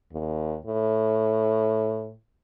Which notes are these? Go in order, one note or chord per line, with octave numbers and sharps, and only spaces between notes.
D#2
A2